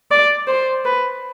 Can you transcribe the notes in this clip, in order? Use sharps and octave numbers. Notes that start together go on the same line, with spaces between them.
D5
C5
B4